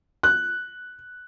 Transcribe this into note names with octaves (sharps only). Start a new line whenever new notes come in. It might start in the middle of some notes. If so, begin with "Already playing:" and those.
F#6